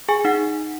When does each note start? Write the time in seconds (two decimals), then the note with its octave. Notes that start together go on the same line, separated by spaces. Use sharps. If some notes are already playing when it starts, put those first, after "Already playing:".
0.09 G#4 G#5
0.25 D#4 F#5